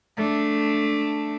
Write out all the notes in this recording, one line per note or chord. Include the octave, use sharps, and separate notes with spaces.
A3 D4